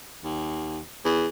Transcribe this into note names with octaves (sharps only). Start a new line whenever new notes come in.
D#2
E2